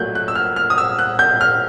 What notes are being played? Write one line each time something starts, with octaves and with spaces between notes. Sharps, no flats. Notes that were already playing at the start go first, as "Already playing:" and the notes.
Already playing: A#2 F#3 A3 F#6 G6
F#6
E6
F6
F6
D#6
E6
F#6
G6
F6